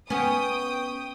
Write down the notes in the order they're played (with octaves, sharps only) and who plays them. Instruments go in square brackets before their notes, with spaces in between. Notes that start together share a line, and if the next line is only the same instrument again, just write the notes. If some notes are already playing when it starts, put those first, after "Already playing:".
[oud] B3 C#4 [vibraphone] B4 C#6 [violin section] G5 D#6